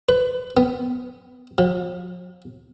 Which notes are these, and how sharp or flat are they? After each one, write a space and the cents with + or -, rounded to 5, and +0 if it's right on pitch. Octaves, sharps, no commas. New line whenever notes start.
B4 +25
B3 +10
F3 +45